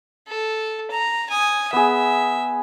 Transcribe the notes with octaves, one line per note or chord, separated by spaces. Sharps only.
A4
A#5
G#5 D#6
B3 G#4 E5